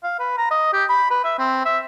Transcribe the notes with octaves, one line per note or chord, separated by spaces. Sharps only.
F5
B4
A#5
D#5
G4
B5
B4
E5
C4
E5